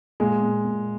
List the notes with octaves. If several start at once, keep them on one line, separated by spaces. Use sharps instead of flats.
A#2 G#3
A#2
A#2